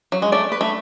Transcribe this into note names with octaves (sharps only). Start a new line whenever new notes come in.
F#3
G#3
A3 D5
B4
A3